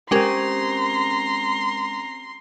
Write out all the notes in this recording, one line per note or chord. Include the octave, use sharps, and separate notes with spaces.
G#3 C4 C#4 G4 A#4 A#5 C6